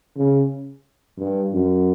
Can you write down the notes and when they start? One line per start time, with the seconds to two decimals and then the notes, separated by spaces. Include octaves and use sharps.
0.16 C#3
1.18 G2
1.52 F#2